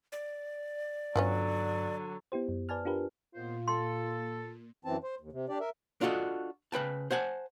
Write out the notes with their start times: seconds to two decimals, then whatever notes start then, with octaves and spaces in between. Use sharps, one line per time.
0.12 D5
1.16 G2 D3 F3 F#3 B3 C#4
2.32 B3 E4 G4 C5
2.49 F#2
2.69 B4 D5 G#5 A5 F6
2.85 D4 F4 G4 A#4 B4
3.35 D#2 A#2 B3 F4 C5
3.68 A4 C6
4.85 F#2 E3 C4 A5
5.04 C5
5.20 D#2
5.32 C3
5.49 D4 G4 D5
5.60 A#4 E5
6.01 D4 F4 F#4 A4 D#5
6.72 C#3 B4 G5 A5
7.11 C5 F#5 G#5 A5